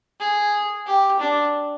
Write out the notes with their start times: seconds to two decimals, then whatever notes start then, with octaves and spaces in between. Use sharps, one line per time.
0.20 G#4
0.87 G4
1.20 D4